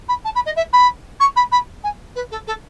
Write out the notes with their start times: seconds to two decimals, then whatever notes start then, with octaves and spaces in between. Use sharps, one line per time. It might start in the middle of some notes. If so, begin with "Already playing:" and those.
0.08 B5
0.25 A5
0.35 B5
0.46 D#5
0.56 E5
0.73 B5
1.20 C#6
1.36 B5
1.52 B5
1.84 G#5
2.15 B4
2.31 A4
2.47 A4